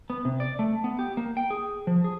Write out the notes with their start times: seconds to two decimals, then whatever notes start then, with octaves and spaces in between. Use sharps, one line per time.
0.10 B3
0.25 C3
0.40 D5
0.59 A3
0.84 B3
0.99 G4
1.17 A#3
1.37 G5
1.51 G#4
1.87 F3
2.04 G#4